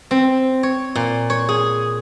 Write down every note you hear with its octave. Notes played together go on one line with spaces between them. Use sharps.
C4
C#5
A#2
C#5
G#4